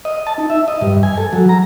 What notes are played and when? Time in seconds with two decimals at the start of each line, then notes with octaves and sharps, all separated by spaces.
0.05 D#5
0.27 A5
0.38 D#4
0.50 E5
0.68 D#5
0.81 G2
1.03 G#5
1.17 A4
1.33 F#3
1.49 A#5